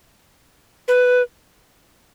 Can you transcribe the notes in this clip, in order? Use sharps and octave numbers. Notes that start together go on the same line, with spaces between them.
B4